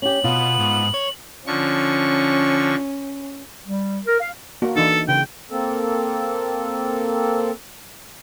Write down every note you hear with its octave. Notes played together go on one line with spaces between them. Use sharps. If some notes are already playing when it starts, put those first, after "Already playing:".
C#4 G4 F#7
B2 B3 F4
G#2
C#5
D3 F3 C#4 C#6
G3
A#4
F5
A#3 F#4
E3 D4 D#4 A4
C#3 G5
A#3 C4 A4